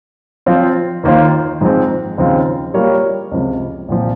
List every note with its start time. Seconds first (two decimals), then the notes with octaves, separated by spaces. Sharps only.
0.46 F3 C4 F4 C5
1.03 D#2 D#3 A#3 F4 C5
1.61 G#2 F3 G#3 C4
2.18 D#2 C#3 F3 C4 F4
2.74 G3 A#3 F4 A#4 C#5
3.32 C#2 C3 F3
3.89 C2 A#2 F3